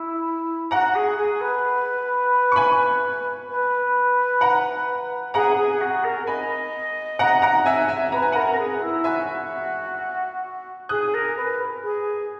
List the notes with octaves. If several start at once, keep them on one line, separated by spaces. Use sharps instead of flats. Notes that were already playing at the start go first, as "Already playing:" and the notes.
Already playing: E4
F#4 F#5 A#5
G#4
G#4
B4
C#6
G#5 B5
B4
F#5 A#5
G#4 F#5 A#5
G#4
F#4
A#4
D#5 G#5 B5
F#5 A#5
F#5 A#5
E5 G#5
E5 G#5
B4 A#5
G#5
A#4 F#5 A#5
A#4
G#4
E4
F#4 E5 G#5
G#4 D#6 F#6
A#4
B4
G#4